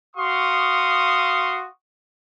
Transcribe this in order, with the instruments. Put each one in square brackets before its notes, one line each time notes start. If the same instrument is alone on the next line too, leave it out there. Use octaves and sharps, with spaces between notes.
[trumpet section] F#4 F5 C6 C#6 D#6